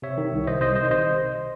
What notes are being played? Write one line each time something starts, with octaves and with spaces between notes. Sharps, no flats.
C3 C#5 E5
D#3
C2
C2 C5 D#5
C3 C5 D#5
D#3 C5 D#5
C3 C5 D#5